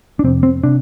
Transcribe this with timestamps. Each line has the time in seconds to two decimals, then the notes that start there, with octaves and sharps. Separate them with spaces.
0.19 D4
0.24 F2 C3 C4
0.43 C4
0.64 C3 D4